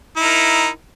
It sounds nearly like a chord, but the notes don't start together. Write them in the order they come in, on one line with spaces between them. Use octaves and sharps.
E4 D#4 A#4